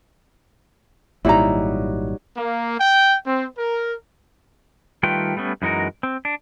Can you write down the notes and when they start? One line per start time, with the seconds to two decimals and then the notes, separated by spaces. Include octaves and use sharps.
1.25 G#1 A#2 F#3 G3 D#4 E4 A#5
2.36 A#3
2.79 G5
3.26 C4
3.57 A#4
5.03 D#3 G3 A3 F4 B4 G5
5.37 G3 A3 B3 C#4
5.62 F#2 E3 G#3 D#4 F#4 A#4
6.03 C4
6.25 D4